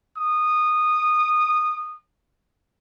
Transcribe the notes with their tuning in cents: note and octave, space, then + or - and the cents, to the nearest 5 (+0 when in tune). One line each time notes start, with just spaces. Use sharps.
D#6 -15